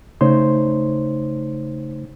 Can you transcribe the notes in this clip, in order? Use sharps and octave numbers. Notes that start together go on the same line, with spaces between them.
C#3 A3 D#4 C5 C#5 C6